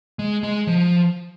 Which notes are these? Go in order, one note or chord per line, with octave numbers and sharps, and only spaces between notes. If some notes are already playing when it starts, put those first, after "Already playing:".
G#3
G#3
F3